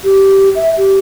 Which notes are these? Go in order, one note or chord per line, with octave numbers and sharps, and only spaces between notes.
G4
E5
G4